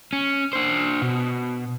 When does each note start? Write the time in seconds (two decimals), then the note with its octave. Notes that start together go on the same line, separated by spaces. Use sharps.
0.13 C#4
0.53 D4 C5
1.02 B2